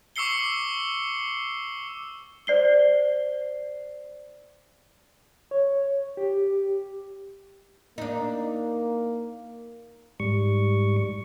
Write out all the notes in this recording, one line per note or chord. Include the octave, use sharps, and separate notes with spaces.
C#6 D6 E6 C7 C#7 G7
C5 D5 C7 G7
C#5
G4
A#3 D4 D#4
G#2 G3 C#6